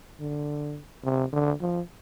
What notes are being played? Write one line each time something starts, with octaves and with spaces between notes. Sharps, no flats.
D3
C3
D3
F3